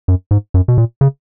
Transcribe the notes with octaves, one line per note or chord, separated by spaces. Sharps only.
F#2
G#2
F#2
B2
A#2
C#3